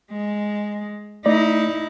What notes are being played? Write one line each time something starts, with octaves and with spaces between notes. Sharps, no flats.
G#3
A3 D#4 E4 D5